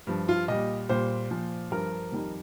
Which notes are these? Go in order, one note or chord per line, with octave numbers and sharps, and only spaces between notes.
G2 F3
F4
A#2 G3 D#5
A#2 G3 C5
A#2 F3
G2 F3 A#4
F2 D#3 G3